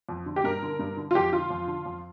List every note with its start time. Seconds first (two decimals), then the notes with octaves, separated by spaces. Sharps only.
0.09 F2
0.26 D3
0.36 G4
0.44 G2 A#4
0.62 D3
0.79 G2
0.97 D3
1.11 F4
1.15 F2 G4
1.32 D3 F4
1.50 F2
1.67 D3
1.85 F2